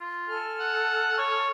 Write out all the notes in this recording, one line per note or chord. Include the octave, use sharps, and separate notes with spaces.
F4
A4 G#5 F6
F#5
C#5